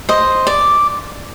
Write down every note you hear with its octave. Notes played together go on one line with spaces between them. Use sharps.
C5 D#5
D5